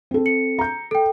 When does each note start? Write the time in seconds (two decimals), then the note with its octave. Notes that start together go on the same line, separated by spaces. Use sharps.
0.11 C4 A4
0.26 C#7
0.59 A#5 G6
0.91 A4 G5